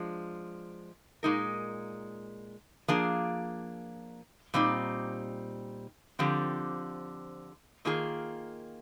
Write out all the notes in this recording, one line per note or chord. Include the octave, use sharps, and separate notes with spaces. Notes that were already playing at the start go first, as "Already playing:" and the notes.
Already playing: F3 G#3 D4
A#2 G#3 D#4 A#4
F3 A#3 D4 G#4
A#2 G3 C4 D#4
D3 F3 C4 G4
D#3 A#3 F4 G#4